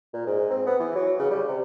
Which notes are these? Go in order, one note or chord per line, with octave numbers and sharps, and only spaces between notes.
A#2
G#2
C4
B3
E3
F#3
C#3
G3
C3